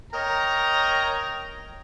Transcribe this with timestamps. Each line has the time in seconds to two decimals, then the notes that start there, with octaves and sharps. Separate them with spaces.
0.13 A#4 C#5 D#5 G5 A#5